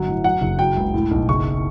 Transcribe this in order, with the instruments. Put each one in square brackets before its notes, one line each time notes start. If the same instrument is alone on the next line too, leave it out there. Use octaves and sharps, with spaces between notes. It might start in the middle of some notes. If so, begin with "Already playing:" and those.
Already playing: [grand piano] G1 F#3 F#5
A2
F#3 F#5
F#1
F#3 G5
C#2
A2
B1
F#1 C#6